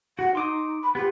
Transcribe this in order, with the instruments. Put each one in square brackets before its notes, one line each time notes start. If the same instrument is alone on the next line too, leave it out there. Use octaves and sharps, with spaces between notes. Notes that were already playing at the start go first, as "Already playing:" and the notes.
[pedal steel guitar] F#4 [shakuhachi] F#5
[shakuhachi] D#4 [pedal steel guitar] C6 D6 D#6
[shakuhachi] B5
[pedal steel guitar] B3 F4 [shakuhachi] G4